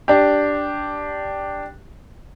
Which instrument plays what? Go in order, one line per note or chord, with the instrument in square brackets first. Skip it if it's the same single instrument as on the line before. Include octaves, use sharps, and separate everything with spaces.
[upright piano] D4 G4